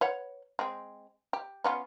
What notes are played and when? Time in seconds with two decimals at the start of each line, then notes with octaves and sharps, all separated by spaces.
0.01 B4 C#5 F#5
0.59 G#3 C4
1.33 G4
1.64 B3 C#4 F4